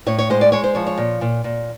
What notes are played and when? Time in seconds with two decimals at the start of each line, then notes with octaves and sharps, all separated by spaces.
0.06 A2 C#5
0.18 C#5
0.30 G#3 C5
0.41 D5
0.52 G#3 C#5
0.64 C5
0.75 F3 C#5
0.87 C#5
0.98 A#2
1.21 A#2
1.44 A#2